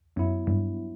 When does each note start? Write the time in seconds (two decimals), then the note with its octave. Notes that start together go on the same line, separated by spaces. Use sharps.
0.16 F#2 F#3 B3 E4
0.47 G2